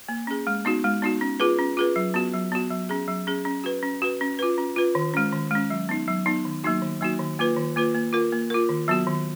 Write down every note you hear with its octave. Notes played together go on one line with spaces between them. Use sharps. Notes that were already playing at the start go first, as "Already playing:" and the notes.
A#3
C#4 G#4
G#3
B3 D#4 F#4
G#3
B3 D#4 F#4
C#4
F4 G#4 B4
C#4
F4 G#4 B4
F#3
B3 F#4
F#3
B3 F#4
F#3
C#4 G#4
F#3
C#4 G#4
C#4
F#4 B4
C#4
F#4 B4
C#4
F4 B4
C#4
F4 B4
D#3
G#3 C#4
D#3
G#3 C#4
F#3
B3 D#4
F#3
B3 D#4
D#3
F#3 A#3 D#4 F#4
D#3
F#3 A#3 D#4 F#4
D#3
A#3 F4 B4
D#3
A#3 F4 B4
A#3
F4 A#4
A#3
F4 A#4
D#3
F#3 B3 F#4
D#3